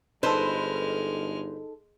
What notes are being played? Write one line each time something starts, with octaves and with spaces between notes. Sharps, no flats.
G1 G#3 D#4 A4 B4 C5 F6